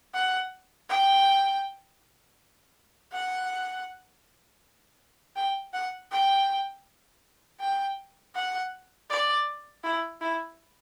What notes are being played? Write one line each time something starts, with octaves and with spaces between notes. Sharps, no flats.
F#5
G5
F#5
G5
F#5
G5
G5
F#5
D5
E4
E4